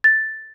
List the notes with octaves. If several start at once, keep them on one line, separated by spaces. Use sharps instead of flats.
A6